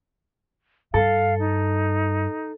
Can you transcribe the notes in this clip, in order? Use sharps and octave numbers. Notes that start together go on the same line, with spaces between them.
G2 A4 F5
D#4